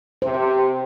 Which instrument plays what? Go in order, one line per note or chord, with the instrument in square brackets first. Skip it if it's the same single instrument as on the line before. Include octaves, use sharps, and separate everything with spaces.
[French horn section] C3 [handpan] C5